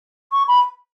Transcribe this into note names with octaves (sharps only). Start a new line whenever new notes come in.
C#6
B5